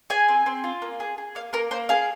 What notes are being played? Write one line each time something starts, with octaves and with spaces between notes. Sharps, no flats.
G#4 G#5
C4
C4
F4
A#3
G#4
G#4
A#3 F5
A#3 A#4
A#3 C5
G#4 F5